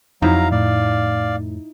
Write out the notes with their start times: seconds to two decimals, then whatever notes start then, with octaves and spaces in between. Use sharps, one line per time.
0.22 F2 F#3 D#4 E4 F5 A#5
0.52 A2 D5 F5